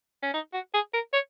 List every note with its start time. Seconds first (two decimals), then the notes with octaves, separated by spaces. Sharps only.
0.22 C#4
0.34 D#4
0.53 F#4
0.74 G#4
0.94 A#4
1.13 C#5